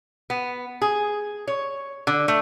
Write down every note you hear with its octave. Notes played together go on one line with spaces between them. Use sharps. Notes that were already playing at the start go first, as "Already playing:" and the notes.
B3
G#4
C#5
D3
A3